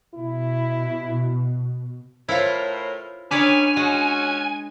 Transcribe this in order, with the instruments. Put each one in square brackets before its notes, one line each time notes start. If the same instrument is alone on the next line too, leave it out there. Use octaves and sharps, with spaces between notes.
[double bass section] B2 [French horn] E4
[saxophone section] A2 A#4 [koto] E4 F4 [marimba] C5 C#5 F5
[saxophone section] D#3 C#4 [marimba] D4 [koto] B4 C#5 D5 [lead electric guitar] G#5
[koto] G#3 [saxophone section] C#4 F#4